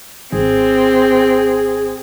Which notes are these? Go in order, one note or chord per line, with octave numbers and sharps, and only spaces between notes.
G#1 C4 G#4